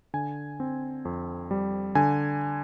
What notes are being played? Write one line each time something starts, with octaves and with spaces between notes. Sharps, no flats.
D3 G#5
C4
F2
G3
D3 G#5